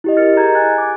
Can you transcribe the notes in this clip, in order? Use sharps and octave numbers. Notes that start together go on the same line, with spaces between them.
E4 G4 D#5
A#4 F6 A6 C#7
G#4 D#5 A#5 G6 G#6
G#5 F#6 G#6 A6
D6